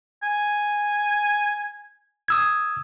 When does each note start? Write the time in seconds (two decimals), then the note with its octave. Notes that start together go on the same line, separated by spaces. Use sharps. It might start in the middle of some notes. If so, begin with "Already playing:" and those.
0.23 G#5
2.28 D#6 E6 G#6